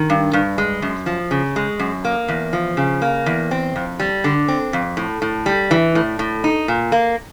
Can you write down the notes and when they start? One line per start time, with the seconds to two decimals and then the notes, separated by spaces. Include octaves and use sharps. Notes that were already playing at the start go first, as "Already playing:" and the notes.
Already playing: D#3
0.10 G2
0.33 G2
0.58 G#3
0.82 F#2
1.06 F3
1.31 C#3
1.56 G#3
1.79 F#2
2.05 A#3
2.28 E2
2.53 F3
2.77 C#3
3.02 A#3
3.26 E2
3.51 C4
3.76 F2
4.00 G3
4.24 D3
4.48 C4
4.73 F2
4.97 A2
5.22 A2
5.46 G3
5.71 E3
5.95 A2
6.19 A2
6.44 D#4
6.68 A#2
6.92 A#3